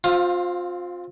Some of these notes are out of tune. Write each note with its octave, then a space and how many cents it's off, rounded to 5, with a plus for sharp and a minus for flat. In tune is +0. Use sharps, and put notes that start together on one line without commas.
C4 +0 F4 +30 F5 +0